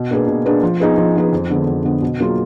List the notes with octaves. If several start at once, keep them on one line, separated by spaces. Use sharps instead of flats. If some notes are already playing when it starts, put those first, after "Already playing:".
Already playing: B2
A#3 D4 G#4 B4
B2
A#3 D4 G#4 B4
F3
B3 D#4 G#4 B4
F3
B3 D#4 G#4 B4
F2
D3 G#3 B3
F2
D3 G#3 B3
B2
F#3 A#3 F4 G#4